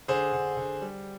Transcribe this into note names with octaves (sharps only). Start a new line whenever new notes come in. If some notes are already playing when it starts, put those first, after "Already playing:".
D3 G#4 C5
D3
D3
G3